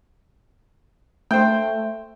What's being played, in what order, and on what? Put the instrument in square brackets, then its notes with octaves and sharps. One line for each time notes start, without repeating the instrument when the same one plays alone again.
[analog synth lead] A3 [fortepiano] C5 G5